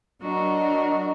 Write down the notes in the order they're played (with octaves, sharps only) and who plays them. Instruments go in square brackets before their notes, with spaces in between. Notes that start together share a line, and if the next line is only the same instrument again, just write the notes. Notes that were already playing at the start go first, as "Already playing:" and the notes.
[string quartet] F#3 D4 F#4 A#4 D#5